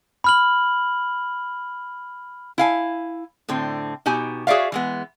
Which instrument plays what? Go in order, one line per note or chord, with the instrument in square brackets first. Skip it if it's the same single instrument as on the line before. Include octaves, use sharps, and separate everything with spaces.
[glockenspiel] B5 F6 F#7
[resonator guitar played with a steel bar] E4 F5 G#5
A2 D3 C4
B2 D#4 G4 G#5
F#4 G#4 C#5 D5 E5 F5
E3 G#3 B3